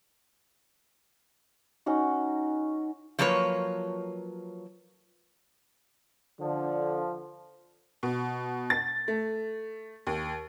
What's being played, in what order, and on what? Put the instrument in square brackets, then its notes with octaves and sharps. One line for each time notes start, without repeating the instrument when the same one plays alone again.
[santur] C#4 D#4 F#4
[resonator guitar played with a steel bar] F3 F#3 A#3 B4 C#5
[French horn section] D3 [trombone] F3
[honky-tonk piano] B2
A6
A3
D#2